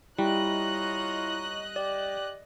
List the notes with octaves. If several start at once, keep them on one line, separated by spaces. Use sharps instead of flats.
G3 E4 F4 C#5 D#5 A#5 F#6
G4 D5